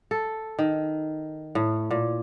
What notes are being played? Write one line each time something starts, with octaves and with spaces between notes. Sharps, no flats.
A4
D#3
A2
A#2